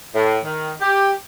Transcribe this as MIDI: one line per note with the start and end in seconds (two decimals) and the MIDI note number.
0.15 0.38 45
0.44 0.72 51
0.81 1.12 67